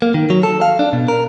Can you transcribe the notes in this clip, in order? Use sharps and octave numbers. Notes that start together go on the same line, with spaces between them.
A#3
D#3
F#3
A4
F5
D4
B2
A#4